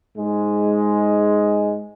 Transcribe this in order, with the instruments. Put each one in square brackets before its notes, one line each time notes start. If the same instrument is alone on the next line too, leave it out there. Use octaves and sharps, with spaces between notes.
[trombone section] G#2 G#3